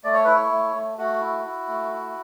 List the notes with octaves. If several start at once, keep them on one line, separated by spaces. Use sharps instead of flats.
A3 D5
C#5
E4 B4
C#5
A3
A3
A3 F#4
E4
E4
A3
E4